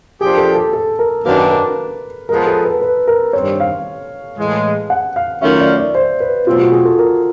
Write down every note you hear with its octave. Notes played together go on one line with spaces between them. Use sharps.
F3 A#3 D4 G4 G#4
A4
A4
A4
A#4
F#2 D#3 F#3 A#3 D4 B4
A#4
F3 G#3 B3 A#4
A4
B4
B4
A#4
G2 D#3 G3 C4 C#5
F5
A2 E3 G#3
F#5
F5
D#3 F#3 A3 C#4 F4 E5
D5
D5
C5
B4
B2 F#3 A3 C4 F4
F#4
G#4
A4
A#4